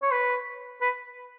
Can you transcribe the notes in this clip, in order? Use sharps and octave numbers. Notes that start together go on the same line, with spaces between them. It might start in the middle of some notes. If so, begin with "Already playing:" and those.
C#5
B4
B4